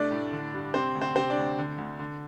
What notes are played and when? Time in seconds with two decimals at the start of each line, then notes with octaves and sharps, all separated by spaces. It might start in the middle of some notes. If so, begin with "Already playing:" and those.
Already playing: C2 A3 D4 D5
0.11 A2
0.32 D3
0.54 G2
0.74 C3 C4 C5
0.95 D2
1.01 C4 C5
1.15 C3 C4 C5
1.30 D4 D5
1.38 D2
1.58 D3
1.78 D2
1.99 D3